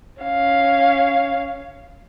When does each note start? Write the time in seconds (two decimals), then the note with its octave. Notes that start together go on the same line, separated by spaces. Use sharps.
0.22 C#4 F5